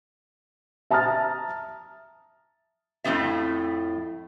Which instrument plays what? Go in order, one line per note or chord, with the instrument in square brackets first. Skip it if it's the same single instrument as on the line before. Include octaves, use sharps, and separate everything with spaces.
[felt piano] E5 A5 A#5 D#6 F6 A6
[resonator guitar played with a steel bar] F2 A2 A3 B3 E5